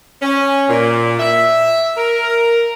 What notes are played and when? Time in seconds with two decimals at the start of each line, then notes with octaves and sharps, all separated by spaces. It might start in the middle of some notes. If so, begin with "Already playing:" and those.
0.22 C#4
0.69 A#2
1.19 E5
1.97 A#4